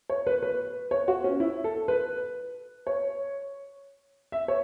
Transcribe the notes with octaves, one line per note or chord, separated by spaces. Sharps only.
C#5
B4
B4
C#5
F#4
C#4
E4
A4
B4
C#5
E5
C#5